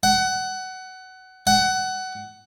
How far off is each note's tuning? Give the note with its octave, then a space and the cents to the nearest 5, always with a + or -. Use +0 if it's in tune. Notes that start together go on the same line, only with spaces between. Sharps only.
F#5 +20
F#5 +20